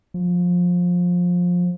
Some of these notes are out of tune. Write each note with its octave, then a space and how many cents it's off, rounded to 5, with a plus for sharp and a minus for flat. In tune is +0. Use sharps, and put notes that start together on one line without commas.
F3 +20